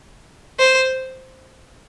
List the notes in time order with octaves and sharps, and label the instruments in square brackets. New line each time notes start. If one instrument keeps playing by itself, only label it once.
[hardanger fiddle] C5